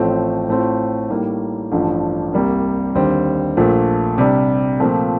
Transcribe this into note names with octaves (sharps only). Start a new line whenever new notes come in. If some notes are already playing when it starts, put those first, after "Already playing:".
Already playing: A1 A2 F3 A3 C4
A2 A3 C4 F4
A2 G3 A#3 D#4
A1 G2 F3 A3
C2 C3 G3 A#3
D#2 D3 G3 C4
A#1 A#2 A3
C3 G3 D4
A#2 F3 A3 C4